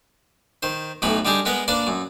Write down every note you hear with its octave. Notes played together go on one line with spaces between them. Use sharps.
D#3 C5
B1 A2 E3 D#4 B5
D3 G3 D#4 G4 G#4
G#3 B3 A#4 B4
A#3 D4 B4 D5
F#2